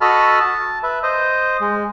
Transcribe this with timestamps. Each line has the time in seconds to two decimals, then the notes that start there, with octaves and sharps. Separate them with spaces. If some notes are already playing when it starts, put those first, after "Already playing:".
0.01 F#4 A4 D#5 A5 B5 F6
0.40 A5
0.83 B4 E5
1.03 C5 D#5
1.60 G#3